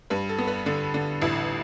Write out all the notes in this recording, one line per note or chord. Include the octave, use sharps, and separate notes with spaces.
G2 B4
A4
B3
B4
D3 A4
D3 A4
A1 E4